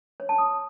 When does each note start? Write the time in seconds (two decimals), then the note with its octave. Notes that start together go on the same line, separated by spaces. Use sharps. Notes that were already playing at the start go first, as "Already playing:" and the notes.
0.20 C#5
0.29 A5
0.38 D#6